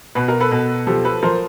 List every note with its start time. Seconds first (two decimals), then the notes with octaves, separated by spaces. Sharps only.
0.15 B2 B4
0.28 A#4
0.40 A4 B4
0.51 B2
0.87 F3 G4 A4
1.05 A4 B4
1.23 F3 A#4 C5